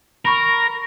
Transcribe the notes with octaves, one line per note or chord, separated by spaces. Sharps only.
A#4 B5 C#6